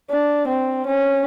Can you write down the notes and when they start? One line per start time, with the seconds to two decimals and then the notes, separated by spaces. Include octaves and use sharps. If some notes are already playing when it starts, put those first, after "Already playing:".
0.10 D4
0.48 C4
0.87 C#4